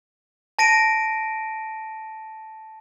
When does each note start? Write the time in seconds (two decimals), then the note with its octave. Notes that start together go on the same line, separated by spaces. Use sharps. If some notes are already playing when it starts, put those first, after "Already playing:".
0.59 A5 A#6 D7 D#7